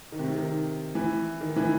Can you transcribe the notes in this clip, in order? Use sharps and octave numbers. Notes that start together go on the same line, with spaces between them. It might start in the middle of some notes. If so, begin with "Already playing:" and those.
D#3
C3
D#3
E3
D#3
E3